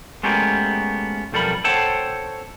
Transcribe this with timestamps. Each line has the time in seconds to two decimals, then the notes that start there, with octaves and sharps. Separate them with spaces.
0.23 G#3 A3 B3 C#4 G4 A#4
1.32 B1 F2 G3 A4 A#4 B5
1.64 A4 C5 C#5 F#5 G5 A5